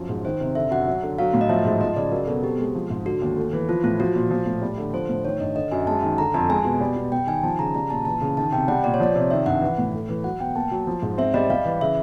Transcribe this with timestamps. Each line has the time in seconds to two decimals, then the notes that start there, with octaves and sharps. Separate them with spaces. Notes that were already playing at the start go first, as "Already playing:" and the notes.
Already playing: F#2 F3
0.09 G#2
0.25 D#3 C5
0.40 C3
0.55 D3 E5
0.71 F#2 F#5
0.87 F#3
1.03 D3
1.18 F#3 F5
1.34 A2
1.41 D#5
1.49 F3 E5
1.65 G#2
1.81 F3 D#5
1.96 C#3 D5
2.12 F#3 A#4
2.27 B2 A4
2.43 C4 G4
2.58 G#3
2.75 F3
2.90 G#2
3.05 D3 F#4
3.22 D#2
3.37 A3
3.53 E3
3.69 F3 F4
3.84 A2 F4
3.99 F3 F#4
4.15 A#2
4.30 F3
4.46 A2
4.62 G3
4.78 D3
4.93 F3 C5
5.09 A2
5.25 D#3 C#5
5.40 G2 D#5
5.55 D3 D#5
5.72 F#2 G#5
5.87 G#3 A5
6.03 D#3
6.18 D3 A#5
6.34 F2 A5
6.49 G#3 G#5
6.65 B2
6.81 G3
6.96 B2
7.12 G3 G5
7.27 D#3 G#5
7.43 F3 A5
7.59 C#3 A#5
7.75 G3 A#5
7.90 A#2 A5
8.05 E3 A5
8.21 C#3
8.37 D#3 A5
8.52 C3 G5
8.68 G3 F#5
8.84 A#2 D5
8.94 C#5
9.00 F3 D5
9.15 C3
9.31 D#3 E5
9.46 G2 F#5
9.62 E3
9.78 A2
9.94 A3
10.09 E3
10.24 F#3 F#5
10.40 B2 G5
10.55 A#3 A5
10.71 F#3
10.87 F3
11.02 G#2
11.18 C4 E5
11.34 G3 D#5
11.50 G3 F5
11.65 E3
11.81 C#3 E5